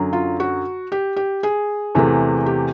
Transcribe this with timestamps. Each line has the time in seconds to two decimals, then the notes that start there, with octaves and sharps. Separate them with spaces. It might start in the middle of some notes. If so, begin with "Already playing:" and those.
Already playing: F#2 D3 F#3
0.13 F4
0.40 F#4
0.92 G4
1.16 G4
1.43 G#4
1.95 E2 C3 E3 A3
2.46 G4